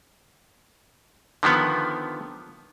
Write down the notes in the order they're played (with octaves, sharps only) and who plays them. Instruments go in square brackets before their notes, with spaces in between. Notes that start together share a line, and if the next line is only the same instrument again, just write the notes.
[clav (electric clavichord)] D3 D#3 F3 B3